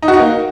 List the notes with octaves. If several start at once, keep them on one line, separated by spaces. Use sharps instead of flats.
D#4
F#4
D#4
A#3